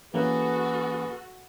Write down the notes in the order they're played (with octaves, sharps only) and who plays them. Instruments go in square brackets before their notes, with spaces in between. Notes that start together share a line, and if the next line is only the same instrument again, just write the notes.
[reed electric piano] E3 A#3 C#4 [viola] F#4 A4 [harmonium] G#4 B4